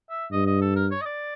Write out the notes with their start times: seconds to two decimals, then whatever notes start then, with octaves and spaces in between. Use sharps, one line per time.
0.10 E5
0.32 G2 D#5
0.46 D#5
0.61 A4
0.76 A#4
0.91 C#5
1.01 D#5
1.05 D5